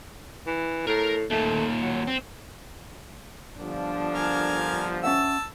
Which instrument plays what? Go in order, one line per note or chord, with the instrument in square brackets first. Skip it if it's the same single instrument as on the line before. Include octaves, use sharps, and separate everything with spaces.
[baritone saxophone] E3
[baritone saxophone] A2 [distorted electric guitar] A#4 A#5
[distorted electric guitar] D#2 A#2 [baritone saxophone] A3
[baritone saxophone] F#3
[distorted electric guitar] C4
[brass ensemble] G1 D3 F3 [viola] D4
[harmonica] A#4 F5 G#5
[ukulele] C#4 E5 F#5 [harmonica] A5 E6